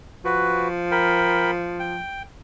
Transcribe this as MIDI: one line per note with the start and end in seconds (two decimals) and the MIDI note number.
0.25 2.01 53
0.25 0.68 66
0.25 0.68 71
0.91 1.51 70
0.91 1.51 79
0.91 1.51 83
1.80 2.23 79